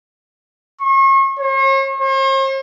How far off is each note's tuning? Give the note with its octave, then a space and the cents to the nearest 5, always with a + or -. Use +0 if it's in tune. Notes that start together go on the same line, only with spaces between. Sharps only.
C#6 -40
C#5 -45
C5 +45